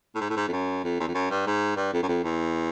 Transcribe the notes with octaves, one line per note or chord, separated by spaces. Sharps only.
A2
G#2
A2
G#2
F2
F#2
F2
E2
F2
F#2
G2
G#2
G2
F2
F#2
F2
E2